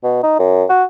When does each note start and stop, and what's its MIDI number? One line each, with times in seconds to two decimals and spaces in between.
0.03 0.22 47
0.23 0.34 63
0.40 0.64 42
0.69 0.84 66